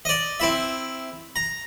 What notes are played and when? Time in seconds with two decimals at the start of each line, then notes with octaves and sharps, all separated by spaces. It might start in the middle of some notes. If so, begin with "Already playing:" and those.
0.05 D5 D#5
0.40 C4 E4 E5
1.36 A#5